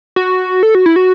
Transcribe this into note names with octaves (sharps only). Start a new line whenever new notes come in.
F#4
A4
F#4
E4
F#4